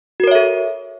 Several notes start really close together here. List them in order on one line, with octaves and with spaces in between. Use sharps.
F#4 A#4 C#5 E5 A4